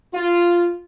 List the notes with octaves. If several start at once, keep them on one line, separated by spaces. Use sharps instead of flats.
F4